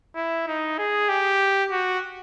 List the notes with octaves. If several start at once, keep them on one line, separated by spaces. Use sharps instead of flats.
E4
D#4
G#4
G4
F#4